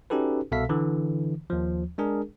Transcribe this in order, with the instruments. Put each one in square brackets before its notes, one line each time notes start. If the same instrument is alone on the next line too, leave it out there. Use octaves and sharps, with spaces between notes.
[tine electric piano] C#4 D#4 F#4 G4 A4 B4
C2 B2 A4 E5 F5 B6
D3 E3
D#2 F3
G#3 D4 G#4 A#4